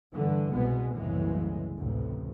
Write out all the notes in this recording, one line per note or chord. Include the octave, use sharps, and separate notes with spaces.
G2 D3 E3
C2 B2 G#3 B3
F#1 C2 A2 C#3 E3 G#3
A1 D2 C3